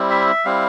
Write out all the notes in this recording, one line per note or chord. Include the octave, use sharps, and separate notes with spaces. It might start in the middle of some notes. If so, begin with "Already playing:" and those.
Already playing: G3 C4 E4
E5
G3 C4 E4 F5